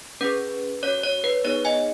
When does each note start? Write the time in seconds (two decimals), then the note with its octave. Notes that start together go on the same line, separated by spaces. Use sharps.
0.21 C#4 G#4 B4
0.82 C#4 F#4 C#5
1.04 C#5
1.24 B4
1.44 B3 D#4 G#4 C#5
1.65 D#5 G#5